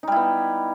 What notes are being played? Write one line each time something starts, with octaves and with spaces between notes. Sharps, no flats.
G3 B3 D#4 E4